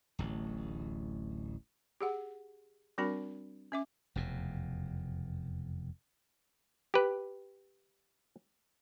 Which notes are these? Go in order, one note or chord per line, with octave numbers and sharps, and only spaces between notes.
D1 A1
G4 G#4 F#5
G3 C4 D4 F#4 A#4 B5
C#4 E5 D6
F1 E2 B2
G4 B4